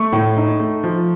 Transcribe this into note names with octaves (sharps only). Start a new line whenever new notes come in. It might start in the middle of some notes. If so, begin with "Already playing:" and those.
Already playing: A3 C#6
A2
D#4
A3
F3